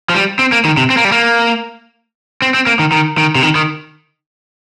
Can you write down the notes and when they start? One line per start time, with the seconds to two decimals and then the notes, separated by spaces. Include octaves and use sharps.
0.09 F3
0.15 G3
0.39 C4
0.52 A#3
0.65 D#3
0.77 C3
0.90 C4
0.97 A#3
1.05 G3
1.12 A#3
2.42 C4
2.54 C4
2.67 A#3
2.79 D#3
2.92 D#3
3.18 D#3
3.35 C3
3.43 D#3
3.55 D#3